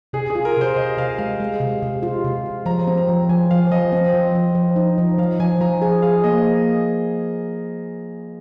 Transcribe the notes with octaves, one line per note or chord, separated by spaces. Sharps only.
C3 G#4
G#4
F4
A#4
C3 C5
C3 D#5
C3 F5
G#3 F5
G#3
C3
C3
F4
C3
C3
F3 A#5
C4
A#5
F3
F3 G#5
F3 F5
F3 D#5
C4
F3
F3
F3
D#4
F3
F3 F5
F3 G#5
F3 A#5
G#4 G#5
G#4 F5
A#3 D#5